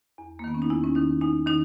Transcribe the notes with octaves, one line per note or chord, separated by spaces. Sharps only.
E2
A#3
D#3 B3
C#4
D#4
E2 E4
C#4
D#3 D#4
E2 D#4
D#3 D#4